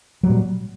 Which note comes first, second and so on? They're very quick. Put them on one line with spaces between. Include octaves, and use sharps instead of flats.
F#3 G3 A#2